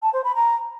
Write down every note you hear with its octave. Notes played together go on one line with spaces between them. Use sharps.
A5
C5
B5
A#5